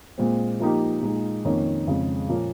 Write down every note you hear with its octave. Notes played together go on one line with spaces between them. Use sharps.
A#2 G#3 C4
F3 A#3 D#4 G4
A#2 G#3 D#4
F2 D#3 A#3 C#4
F2 C#3 G#3
A#2 F3 A#3 C#4